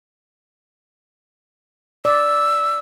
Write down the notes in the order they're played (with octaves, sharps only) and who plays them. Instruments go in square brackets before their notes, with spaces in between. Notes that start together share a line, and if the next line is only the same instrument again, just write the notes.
[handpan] D5 [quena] E6